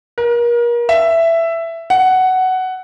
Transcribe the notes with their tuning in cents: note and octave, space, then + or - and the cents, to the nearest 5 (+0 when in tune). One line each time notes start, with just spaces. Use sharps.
A#4 +35
E5 +10
F#5 +10